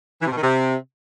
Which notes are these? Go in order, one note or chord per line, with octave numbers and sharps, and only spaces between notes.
E3
C3
B2
D#3
C3